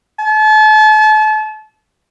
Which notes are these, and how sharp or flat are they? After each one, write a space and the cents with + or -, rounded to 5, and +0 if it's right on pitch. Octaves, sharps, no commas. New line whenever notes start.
A5 -35